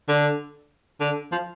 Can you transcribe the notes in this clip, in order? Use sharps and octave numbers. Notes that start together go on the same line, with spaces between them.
D3
D3
F3